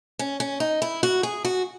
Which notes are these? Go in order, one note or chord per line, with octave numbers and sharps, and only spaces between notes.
C#4
C#4
D#4
E4
F#4
G#4
F#4